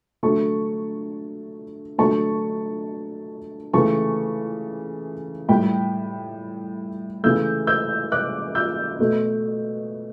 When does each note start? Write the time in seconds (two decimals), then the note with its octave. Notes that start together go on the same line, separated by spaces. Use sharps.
0.23 D3 F#3 A3 A5 C#6
1.98 D3 F#3 A3 A5 C#6
3.74 C#3 E3 A3 A5 C#6
5.49 A2 G3 G5 B5
7.23 C#3 E3 A3 E6 G6
7.67 E6 G6
8.12 D6 F#6
8.55 E6 G6
8.99 B2 A3